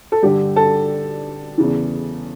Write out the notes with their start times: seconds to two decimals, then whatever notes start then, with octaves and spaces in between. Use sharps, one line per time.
0.12 A4
0.23 G2 D3 G4
0.56 A4
1.58 E2 C#3 E3